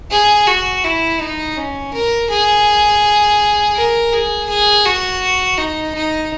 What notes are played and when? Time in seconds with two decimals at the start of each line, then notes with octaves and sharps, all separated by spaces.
0.11 G#4
0.48 F#4
0.84 E4
1.21 D#4
1.57 C#4
1.93 A#4
2.30 G#4
3.76 A#4
4.13 G#4
4.49 G#4
4.85 F#4
5.58 D#4
5.95 D#4